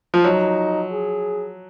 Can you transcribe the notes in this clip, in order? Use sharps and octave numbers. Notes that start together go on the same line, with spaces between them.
F3
F#3 D#4
G#4